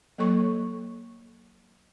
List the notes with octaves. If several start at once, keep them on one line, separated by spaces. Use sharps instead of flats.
F#3 A#3 A4 C#5 C#6